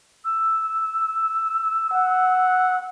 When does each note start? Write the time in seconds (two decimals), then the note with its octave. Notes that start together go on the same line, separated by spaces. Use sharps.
0.24 E6
1.93 F#5